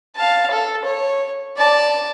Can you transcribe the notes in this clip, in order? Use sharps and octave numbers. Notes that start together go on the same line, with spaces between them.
F5 A5
A4
C#5
D5 A5